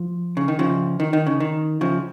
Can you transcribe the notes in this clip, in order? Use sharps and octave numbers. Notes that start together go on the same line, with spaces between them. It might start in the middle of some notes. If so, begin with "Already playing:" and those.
Already playing: F3
C#3
D#3
C#3 F3
D#3
D#3
C#3
D#3
C#3 F3